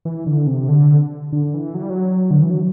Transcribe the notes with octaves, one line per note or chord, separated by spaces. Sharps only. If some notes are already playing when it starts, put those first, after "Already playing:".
E3
D3
C3
D3
D3
E3
F#3
G3
F#3
D3
E3
F#3